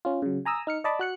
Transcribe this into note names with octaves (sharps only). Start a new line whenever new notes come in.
C#4 F4
C#3 F#3
G#5 A#5 D#6 E6
D#4 F6 C#7
D5 D#5 A5 B5 D6
F#4 F#6 C#7